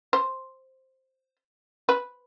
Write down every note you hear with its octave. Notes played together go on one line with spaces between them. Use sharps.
C5
B4